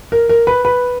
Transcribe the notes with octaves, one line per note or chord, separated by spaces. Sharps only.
A#4
A#4
B4
B4